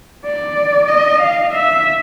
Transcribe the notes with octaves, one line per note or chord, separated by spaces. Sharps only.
D5
D#5
F5
E5